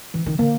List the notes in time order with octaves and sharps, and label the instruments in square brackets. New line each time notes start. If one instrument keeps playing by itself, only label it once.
[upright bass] E3
D#3
[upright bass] D3 [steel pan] A#3